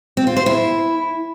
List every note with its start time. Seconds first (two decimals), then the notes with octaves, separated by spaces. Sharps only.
0.17 C4
0.27 F4
0.37 C5
0.46 E4